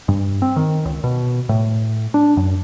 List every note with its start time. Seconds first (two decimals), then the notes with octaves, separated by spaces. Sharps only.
0.08 G2
0.42 C4
0.56 D#3
0.85 C#2
1.04 B2
1.49 A2
2.14 D4
2.37 F#2